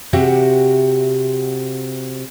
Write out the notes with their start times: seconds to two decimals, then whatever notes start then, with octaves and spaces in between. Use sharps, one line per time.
0.13 C3 C4 F#4 G4 E5 F#5